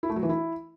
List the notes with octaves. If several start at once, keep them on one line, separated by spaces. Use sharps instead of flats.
E4
A3
F#3
E3
E4